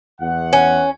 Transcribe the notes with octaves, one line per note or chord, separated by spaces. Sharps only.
E2 F#5
C#4